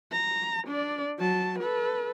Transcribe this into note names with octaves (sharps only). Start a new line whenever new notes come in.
A#5
D4 D5
F#3 A5
A4 B4